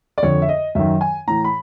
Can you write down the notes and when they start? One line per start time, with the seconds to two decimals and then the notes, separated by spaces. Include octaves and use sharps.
0.18 D5
0.23 F2 D3 C#5
0.42 E5
0.49 D#5
0.75 F#2 D#3 E5
1.01 G#5
1.27 A2 E3 A#5
1.44 B5